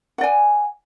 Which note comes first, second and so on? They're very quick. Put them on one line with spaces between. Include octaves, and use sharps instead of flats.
F#5 D5 G#5